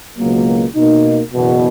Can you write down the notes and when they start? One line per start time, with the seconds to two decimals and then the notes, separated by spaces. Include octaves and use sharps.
0.19 C#2 B2 F#3 A#3
0.75 B2 A#3 D#4
1.32 F#1 E2 B2